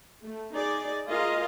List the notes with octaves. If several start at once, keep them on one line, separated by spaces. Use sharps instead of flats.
A3
D#4 G#4 D5
F4 G#4 A#4 D#5 F5